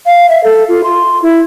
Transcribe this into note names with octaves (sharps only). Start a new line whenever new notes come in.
F5
E5
A4
F4
C6
E4